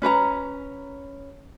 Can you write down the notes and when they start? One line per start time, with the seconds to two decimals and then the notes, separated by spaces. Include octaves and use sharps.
0.02 C#4 B4 C#5 A#5